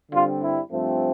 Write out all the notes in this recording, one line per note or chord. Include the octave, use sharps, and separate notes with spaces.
G2 D3 G3 C4 F4
E4
G2 F3 A3 C4